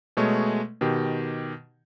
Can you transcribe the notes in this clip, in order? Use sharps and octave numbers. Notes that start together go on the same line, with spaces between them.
B2 G#3 A3 C#5
B2 D#3 G4